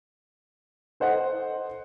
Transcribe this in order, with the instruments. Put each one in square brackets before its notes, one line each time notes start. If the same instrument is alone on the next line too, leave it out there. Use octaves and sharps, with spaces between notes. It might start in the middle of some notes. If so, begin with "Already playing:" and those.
[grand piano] A4 C5 D#5 F#5